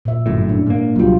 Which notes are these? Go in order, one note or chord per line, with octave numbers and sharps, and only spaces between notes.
A#2 E5
G1 F#2 A2
D4
G#2 A#3
C2 F#3 G3 F4